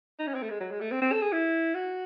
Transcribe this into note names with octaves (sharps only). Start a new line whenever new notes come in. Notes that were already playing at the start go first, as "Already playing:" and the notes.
D#4
C#4
C4
A3
G#3
F#3
G#3
A3
C4
C4
A4
G#4
E4
F#4